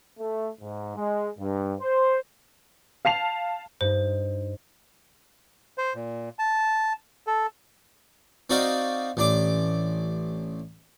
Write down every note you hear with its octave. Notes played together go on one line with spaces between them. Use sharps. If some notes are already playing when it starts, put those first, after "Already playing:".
A3
G#2
G#3
G2
C5
F5 A5 C7 F7
G2 D#4 C5
C5
A#2
A5
A4
C4 D#4 F#4 D5 D#5 F5
A1 D4 D6